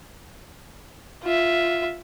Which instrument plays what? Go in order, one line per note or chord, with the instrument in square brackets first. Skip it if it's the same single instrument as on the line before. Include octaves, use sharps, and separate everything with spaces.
[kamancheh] F4 E5